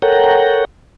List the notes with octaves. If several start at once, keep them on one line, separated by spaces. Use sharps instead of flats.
A4 A#4 C#5 F#5 G5 A#5